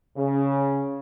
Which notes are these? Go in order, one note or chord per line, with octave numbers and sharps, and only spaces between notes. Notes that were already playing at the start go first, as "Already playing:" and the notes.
C#3